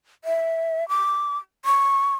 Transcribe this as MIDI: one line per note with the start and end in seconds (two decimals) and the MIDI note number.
0.24 0.88 76
0.89 1.38 86
1.65 2.16 85